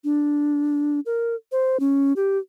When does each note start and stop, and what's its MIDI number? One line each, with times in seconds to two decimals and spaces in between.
0.04 1.00 62
1.06 1.35 70
1.52 1.80 72
1.80 2.13 61
2.16 2.38 67